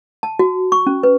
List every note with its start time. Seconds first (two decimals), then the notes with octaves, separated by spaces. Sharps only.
0.23 A5
0.39 F#4
0.72 C#6
0.87 C#4
1.03 B4